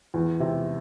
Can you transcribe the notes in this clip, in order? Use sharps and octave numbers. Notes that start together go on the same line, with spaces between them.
E2
C3